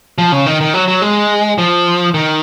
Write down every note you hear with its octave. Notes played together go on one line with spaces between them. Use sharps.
F3
C#3
D#3
D#3
F#3
F#3
G#3
F3
D#3